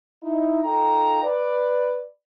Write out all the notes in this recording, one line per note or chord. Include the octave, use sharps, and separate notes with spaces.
D#4 E4
D#4 F4 A4 G5 A#5
B4 D5